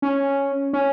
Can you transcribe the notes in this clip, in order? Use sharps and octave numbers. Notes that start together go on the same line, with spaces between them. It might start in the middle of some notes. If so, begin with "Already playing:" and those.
C#4
C#4